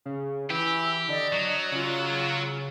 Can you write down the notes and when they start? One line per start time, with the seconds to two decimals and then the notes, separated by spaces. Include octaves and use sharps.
0.05 C#3
0.50 E3 G4 B5 E6
1.08 D3 D5 D#5
1.33 F#3
1.71 C#3 F4 F#6